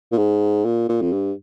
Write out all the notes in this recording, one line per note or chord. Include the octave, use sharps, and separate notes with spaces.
A#2
G#2
A#2
A#2
F2
G2